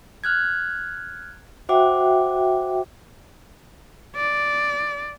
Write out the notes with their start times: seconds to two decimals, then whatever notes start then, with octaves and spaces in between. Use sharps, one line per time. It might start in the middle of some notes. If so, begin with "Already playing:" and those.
0.24 F6 F#6 G#6
1.69 F#4 C5 E5 F#5 G5 D6
4.16 D5